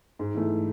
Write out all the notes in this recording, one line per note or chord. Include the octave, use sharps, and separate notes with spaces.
G#2
E3 A3 E4